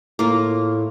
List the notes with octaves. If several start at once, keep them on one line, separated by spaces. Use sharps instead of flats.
A2 A#3 F4